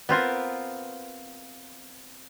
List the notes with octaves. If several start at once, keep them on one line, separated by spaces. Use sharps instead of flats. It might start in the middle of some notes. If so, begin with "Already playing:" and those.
B3 C4 F4 A#4